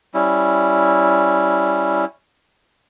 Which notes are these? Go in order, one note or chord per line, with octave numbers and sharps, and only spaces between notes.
G3 C#4 E4